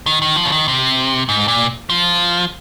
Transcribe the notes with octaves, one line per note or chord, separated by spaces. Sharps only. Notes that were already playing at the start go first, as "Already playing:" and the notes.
D#3
D#3
F3
C#3
D#3
C3
G#2
A#2
F3